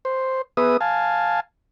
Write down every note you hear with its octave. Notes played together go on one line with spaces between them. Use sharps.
C5
B3 G#4 B4 E5 D#6
F5 G#5 A5